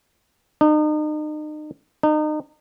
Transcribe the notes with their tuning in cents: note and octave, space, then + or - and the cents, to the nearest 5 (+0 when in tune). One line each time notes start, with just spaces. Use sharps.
D#4 -35
D#4 -30